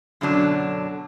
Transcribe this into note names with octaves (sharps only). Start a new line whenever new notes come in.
F#2 B2 D3 F#3 D4